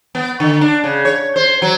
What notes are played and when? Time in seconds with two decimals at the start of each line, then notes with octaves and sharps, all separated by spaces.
0.15 B3
0.40 D3
0.61 D4
0.84 C#3
1.05 C#5
1.36 C5
1.62 F#3